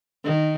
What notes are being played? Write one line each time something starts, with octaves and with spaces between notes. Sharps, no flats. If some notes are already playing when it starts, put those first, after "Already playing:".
D#3